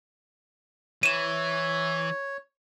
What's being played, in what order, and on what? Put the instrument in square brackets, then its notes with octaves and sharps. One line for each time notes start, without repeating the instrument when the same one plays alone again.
[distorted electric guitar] E3 [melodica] C#5 [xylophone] D#7 E7